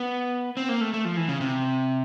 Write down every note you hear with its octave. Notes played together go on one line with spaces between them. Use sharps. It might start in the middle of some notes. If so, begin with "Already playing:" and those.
Already playing: B3
C4
A#3
A3
A3
F3
E3
C#3
C3